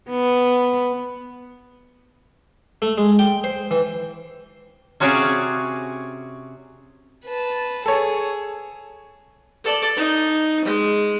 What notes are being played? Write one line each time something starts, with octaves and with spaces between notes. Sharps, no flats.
B3
A3
G#3
G5
C5
E3
C3 C#4 F#4 G#4 D5 F5
B4 A5
G#4 A4 C#5
A4 D5
D#4
G#3